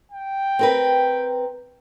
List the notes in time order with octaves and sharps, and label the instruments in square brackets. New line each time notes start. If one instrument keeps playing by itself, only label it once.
[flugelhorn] G5
[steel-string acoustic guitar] C4 A#4 B4